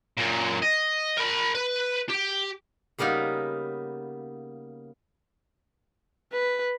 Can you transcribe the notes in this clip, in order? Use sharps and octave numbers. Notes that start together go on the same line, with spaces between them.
F#2 A#2
D#5
A#4 B5
B4
G4
C#3 G3 A#3 B3 D#4
B4